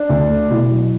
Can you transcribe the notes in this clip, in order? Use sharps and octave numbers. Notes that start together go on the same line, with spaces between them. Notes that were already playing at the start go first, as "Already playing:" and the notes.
Already playing: D4
D2
A3
B2 E4
F#3